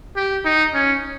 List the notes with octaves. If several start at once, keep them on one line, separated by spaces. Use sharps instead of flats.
G4
D#4
C#4